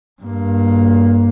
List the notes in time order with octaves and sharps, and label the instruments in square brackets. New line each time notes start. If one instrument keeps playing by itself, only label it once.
[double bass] G2 A#3